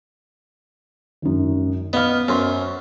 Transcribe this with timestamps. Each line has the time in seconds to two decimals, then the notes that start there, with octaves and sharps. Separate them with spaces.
1.22 G#1 F#2
1.93 B3 D#5 F5 F6
2.28 F#2 C5 C6